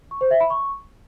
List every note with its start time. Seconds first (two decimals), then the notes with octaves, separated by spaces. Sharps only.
0.11 C#6
0.21 C5
0.31 E5
0.40 B5
0.50 C#6